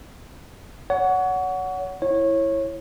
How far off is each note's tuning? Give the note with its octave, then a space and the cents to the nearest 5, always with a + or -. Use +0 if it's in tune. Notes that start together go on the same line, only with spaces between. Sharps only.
C#5 +30 F#5 +0
E4 +0 C#5 -20